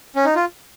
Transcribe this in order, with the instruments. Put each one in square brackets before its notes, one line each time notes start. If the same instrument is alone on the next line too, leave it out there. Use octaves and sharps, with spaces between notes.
[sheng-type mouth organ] C#4
D#4
F4